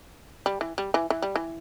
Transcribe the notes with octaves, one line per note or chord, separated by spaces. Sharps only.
G3
E3
G3
E3
E3
G3
E3